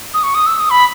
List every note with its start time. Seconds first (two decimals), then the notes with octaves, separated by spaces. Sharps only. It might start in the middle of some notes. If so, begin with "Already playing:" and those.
0.14 D#6
0.23 C#6
0.35 D#6
0.46 E6
0.59 D#6
0.70 B5